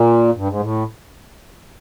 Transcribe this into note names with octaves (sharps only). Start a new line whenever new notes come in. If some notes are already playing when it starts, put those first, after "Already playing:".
Already playing: A#2
G2
G#2
A2